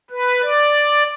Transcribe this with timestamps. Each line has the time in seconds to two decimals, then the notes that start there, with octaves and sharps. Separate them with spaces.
0.10 B4
0.42 D5